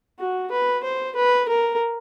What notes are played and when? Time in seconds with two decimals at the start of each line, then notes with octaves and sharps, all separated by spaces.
0.19 F#4
0.52 B4
0.84 C5
1.16 B4
1.48 A#4